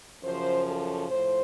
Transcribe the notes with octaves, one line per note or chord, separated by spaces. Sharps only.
F#2 C#3 F3 C5
A4
A2 F3 C5